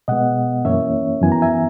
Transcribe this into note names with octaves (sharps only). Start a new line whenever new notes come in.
B2 G#3 B3 D#5 F#5
F#2 E3 A#3 C#4 C#5 E5
F#2 E3 B3 G#5
A#5
E5 G#5